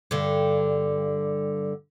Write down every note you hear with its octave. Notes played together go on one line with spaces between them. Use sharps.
G2 D3